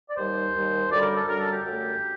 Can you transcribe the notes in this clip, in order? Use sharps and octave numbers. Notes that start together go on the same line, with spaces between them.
D5
D#2 D#3 G3 C5
D#2 D#3 G3
F#2 D3 G3 D5
A#4
A4
F#2 D3 G3 A#4
A4
G4
F#2 D3 A3